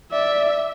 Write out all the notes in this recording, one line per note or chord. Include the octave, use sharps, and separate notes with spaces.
D5 E5